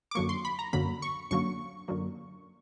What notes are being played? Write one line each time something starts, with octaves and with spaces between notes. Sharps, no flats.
D6
F#2 D3 F#3 A#3 C#6
C6
B5
A#5
F#2 D3 F#3 A#3 B5
C#6
F#2 D3 F#3 A#3 C#6
F#2 D3 F#3 A#3